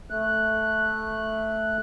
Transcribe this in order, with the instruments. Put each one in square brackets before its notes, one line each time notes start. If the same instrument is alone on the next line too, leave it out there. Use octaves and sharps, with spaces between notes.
[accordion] A3 F#6